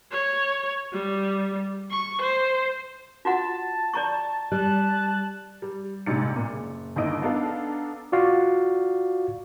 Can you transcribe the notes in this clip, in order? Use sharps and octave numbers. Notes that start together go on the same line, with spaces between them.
C#5
G3
C#6
C5
F4 F#4 F#5 A5
D5 A#5 C#6
G3 A5 F#6
G3
A#1 G#2 C3 D5 C#7
A#2
F#1
G1 D#2 D4 E4 D#5 D7
B3 D4 D#4 A4 F5
F4 F#4 D5 F5